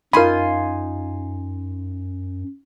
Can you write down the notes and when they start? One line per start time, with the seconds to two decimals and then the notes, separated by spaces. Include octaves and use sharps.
0.13 F#2 D#4 F4 A#4 G#5 B5 C6